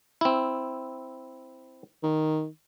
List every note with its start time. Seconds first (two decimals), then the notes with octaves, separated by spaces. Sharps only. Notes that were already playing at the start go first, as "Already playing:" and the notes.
0.21 C4 E4
2.03 D#3